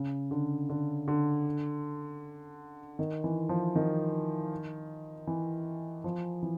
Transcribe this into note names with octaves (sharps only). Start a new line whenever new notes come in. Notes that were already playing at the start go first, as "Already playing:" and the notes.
Already playing: C#3
D3
D3
D3
D#3
E3
F3
D#3
E3
F3
E3